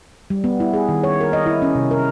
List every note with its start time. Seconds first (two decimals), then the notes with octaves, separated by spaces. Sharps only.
0.30 G3
0.44 B3
0.60 E4
0.74 G#4
0.89 D#3
1.03 C#5
1.21 A#4
1.33 D#5
1.46 E4
1.62 C#4
1.75 C3
1.91 A#4